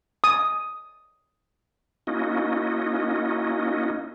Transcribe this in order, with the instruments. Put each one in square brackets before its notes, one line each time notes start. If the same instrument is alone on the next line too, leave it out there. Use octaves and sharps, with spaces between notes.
[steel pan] D#6
[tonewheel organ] A#3 C#4 D#4 E4 F#4 D#5